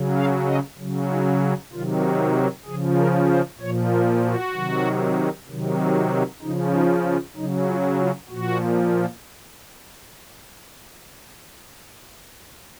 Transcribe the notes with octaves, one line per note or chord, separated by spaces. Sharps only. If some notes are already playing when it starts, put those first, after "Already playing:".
Already playing: C#3 F#3
F5
D#5
C#3 F#3
D#4
C3 D#3 F#3 F4
F#4
F#4
C#3 F3 G#4
A#4
C5
A#2 F3 C#5
A#4
F#4
C3 D#3 F#3
C3 D#3 F#3
C#3 F3 D#4
D#4
F4
C#3 F#3 D#4
F4
F4
A#2 F3 F#4